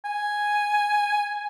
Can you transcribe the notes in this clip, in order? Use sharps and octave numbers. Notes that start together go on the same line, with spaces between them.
G#5